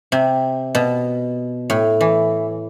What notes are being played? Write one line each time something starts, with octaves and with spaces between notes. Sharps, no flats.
C3
B2
A2
E3